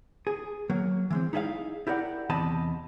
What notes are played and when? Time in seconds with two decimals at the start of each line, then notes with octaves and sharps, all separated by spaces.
0.27 G#4
0.70 F#3 A#3
1.10 E3 G#3 C4
1.33 D#4 E4 G#4 D#5 F5
1.87 E4 G4 A#4 D5 F#5
2.30 E2 C3 E3 D#5 A5 B5